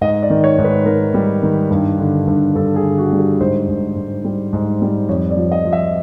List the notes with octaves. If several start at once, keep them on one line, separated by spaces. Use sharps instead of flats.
G#2 D#5
D5
D#3
C#5
G#2
B4
D#3 A#4
G3
D#3
G2
D3
G2
G2 A4
G#4
D3
F#4
G3
G4
G#2 C5
G#2
G#2
G3
G#2
G3
F2 C#5
D5
F3
D#5
F3
E5